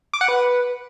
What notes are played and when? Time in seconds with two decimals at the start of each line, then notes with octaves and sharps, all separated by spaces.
0.14 D6
0.21 F#5
0.28 B4